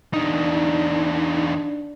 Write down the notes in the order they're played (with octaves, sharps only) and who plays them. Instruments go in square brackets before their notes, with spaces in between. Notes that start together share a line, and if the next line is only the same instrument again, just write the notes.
[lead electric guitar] E2 D#4 [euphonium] D4